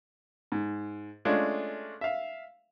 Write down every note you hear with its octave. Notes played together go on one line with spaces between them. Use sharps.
G#2
G#3 A3 C#4 D4 F4
E5 F5